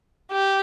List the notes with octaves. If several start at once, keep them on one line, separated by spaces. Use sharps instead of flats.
G4